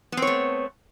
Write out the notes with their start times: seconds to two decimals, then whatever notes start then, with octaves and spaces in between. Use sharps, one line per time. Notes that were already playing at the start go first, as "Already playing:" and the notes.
0.12 B3
0.17 C4
0.22 C#5
0.27 A3